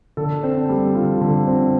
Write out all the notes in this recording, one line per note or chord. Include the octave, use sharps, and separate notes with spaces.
D3 A4
C4 C5
G3
D3 F4
D3
C4